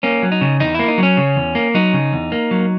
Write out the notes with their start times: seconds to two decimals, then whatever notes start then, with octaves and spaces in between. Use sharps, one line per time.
0.03 A#3 C#4
0.23 F#3
0.32 D#4
0.41 C#3
0.60 E2 D#4
0.74 A#3 E4
0.88 D#4
0.98 F#3
1.03 C#4
1.17 C#3
1.36 E2
1.55 A#3
1.74 F#3 D#4
1.93 C#3
2.13 E2
2.32 A#3
2.51 F#3